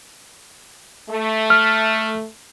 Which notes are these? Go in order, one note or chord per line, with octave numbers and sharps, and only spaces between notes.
A3
F6